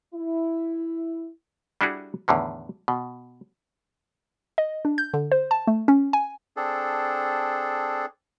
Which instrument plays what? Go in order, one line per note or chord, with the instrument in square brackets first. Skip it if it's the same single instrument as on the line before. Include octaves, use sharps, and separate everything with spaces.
[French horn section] E4
[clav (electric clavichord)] G3 D4 E4 F#4 G#4
E2 A2 D3 D#3
B2
[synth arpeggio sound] D#5
D4
G6
D3
C5
A5
A3
C#4
G#5
[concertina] C4 D4 G#4 A4